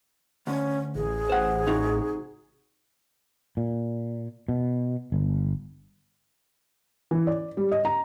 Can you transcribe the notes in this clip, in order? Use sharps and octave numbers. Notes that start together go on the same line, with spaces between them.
D2 C#4
A1 G#4
C5 F#5
C3 D#4 F#4
A#2
B2
G1
E3
D5
G3
D#5
A#5